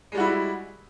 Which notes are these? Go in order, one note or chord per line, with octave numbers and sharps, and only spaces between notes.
G3 G#3 E4 F#4